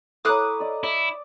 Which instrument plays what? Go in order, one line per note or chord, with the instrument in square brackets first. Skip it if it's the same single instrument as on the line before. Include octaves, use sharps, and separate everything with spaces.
[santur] E4 C#5 [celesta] A4 A#5 [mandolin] D6 D#6 F#6
[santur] D5 D#5
[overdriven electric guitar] E4 [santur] D5